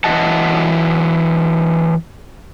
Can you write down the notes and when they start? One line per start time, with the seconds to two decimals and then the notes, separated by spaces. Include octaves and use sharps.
0.04 E3 F#3 D#5 F#5 A5